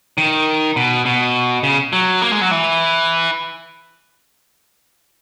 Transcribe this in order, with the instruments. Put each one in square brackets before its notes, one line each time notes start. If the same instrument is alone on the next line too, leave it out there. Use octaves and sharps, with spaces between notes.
[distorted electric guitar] D#3
B2
B2
C#3
F#3
A#3
G#3
F#3
E3